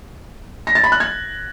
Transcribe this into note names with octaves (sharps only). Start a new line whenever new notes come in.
A#6
A6
B5
F#6
G#6